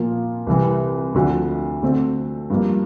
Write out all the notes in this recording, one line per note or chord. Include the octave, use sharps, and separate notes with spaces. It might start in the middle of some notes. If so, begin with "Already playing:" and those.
Already playing: A#2 F3 A#3 F4
C2 C3 E3
D2 D3 F3
D3 A3 C4
G2 F3 A#3